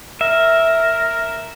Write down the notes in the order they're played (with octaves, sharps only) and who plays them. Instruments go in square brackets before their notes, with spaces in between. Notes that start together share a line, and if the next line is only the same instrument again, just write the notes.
[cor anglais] A#4 [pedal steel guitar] E5